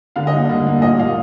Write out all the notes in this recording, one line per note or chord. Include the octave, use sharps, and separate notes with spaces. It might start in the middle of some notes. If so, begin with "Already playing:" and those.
D3 F5
D#5
G3 A#3
D3
G3 A#3
A#2 D#5
G3 A#3 F5